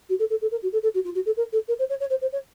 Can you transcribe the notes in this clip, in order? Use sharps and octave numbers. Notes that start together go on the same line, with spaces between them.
F#4
A4
A4
A4
A#4
F#4
A4
A4
F#4
F4
F#4
A4
A#4
A4
A#4
C5
C#5
C#5
C5
C5
C#5